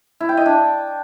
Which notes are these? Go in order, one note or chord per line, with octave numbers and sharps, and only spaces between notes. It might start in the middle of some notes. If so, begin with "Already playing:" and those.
E4
G5
D#5
D4